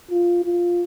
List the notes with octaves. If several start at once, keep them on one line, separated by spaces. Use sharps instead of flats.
F4
F4